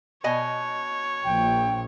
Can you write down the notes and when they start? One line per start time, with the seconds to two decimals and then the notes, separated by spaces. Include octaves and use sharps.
0.24 B2 C#5 D#5 G#5
1.25 A#1 G5